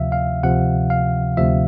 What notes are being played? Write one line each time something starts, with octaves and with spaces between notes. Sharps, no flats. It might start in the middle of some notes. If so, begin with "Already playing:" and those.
Already playing: D2 C3 F3 E5 F5
F5
D2 C3 F3 F#5
F5
D2 C3 F3 E5